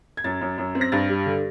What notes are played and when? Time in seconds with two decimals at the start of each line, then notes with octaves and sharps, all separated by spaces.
0.17 G#6
0.24 F#2 A6
0.41 F#2
0.58 F#2
0.75 C4
0.81 A#6
0.92 G2 A6
1.09 G3
1.26 D3